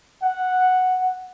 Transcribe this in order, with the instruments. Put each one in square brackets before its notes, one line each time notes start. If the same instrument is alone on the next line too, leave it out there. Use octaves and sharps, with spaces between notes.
[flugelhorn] F#5